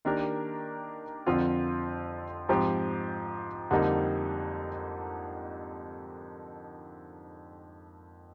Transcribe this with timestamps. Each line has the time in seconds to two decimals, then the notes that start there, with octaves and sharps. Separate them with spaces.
0.05 D#3 A#3 D4 G4 A#4
1.26 F2 D3 F3 C4 F4
2.49 G#2 F3 C4 G4
3.71 F2 D3 G3 A#3 D#4